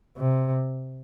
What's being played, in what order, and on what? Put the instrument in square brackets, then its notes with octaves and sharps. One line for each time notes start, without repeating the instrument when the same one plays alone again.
[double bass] C3